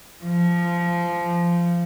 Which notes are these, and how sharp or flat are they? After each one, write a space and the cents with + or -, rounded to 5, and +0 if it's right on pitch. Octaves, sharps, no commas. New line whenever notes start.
F3 -15